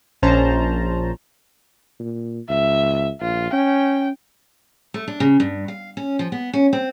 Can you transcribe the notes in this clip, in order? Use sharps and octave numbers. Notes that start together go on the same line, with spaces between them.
A#1 C#4 C5 A5 A#5
A#2
C#2 E5
A#1 F4
C#4 G5
A3
D4
C#3
G2
F5
C#4
F3
B3
C#4
C4